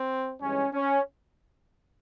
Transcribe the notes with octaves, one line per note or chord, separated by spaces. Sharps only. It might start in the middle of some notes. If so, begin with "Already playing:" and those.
Already playing: C4
G2 E3 G#3 C#4
C#4